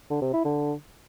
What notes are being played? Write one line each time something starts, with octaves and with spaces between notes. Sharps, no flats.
D3
C3
E4
D3